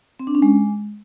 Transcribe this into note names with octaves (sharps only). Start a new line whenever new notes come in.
C4
D4
C#4
G#3